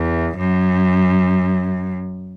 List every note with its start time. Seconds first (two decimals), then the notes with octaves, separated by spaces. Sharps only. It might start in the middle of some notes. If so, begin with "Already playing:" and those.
Already playing: E2
0.38 F#2